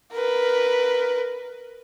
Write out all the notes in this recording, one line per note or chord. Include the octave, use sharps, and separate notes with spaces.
A#4 B4